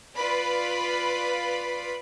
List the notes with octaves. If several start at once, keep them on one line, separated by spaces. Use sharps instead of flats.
F4 B4 D5 B5